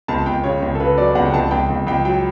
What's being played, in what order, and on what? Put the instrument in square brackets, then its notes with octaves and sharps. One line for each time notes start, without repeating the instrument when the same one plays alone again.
[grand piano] C#2 A5
C#2 G5
C#3 C#5
C#2
A4
C#3 B4
F#3 D5
C#2 F#5
G5
C#2 A5
C#2 G5
C#2
C#2 G5
F#3 G5